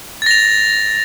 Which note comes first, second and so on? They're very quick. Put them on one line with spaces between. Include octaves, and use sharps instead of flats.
A6 A#6 F7